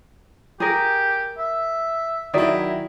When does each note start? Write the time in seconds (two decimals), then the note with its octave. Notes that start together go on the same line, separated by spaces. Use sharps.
0.60 G4 G#4 A#4
1.38 E5
2.34 D#3 F#3 E4 G#4 D5 E5